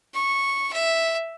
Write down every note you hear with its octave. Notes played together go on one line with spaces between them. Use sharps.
C#6
E5